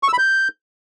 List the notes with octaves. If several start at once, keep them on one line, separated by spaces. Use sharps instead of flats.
C#6
E6
B5
G6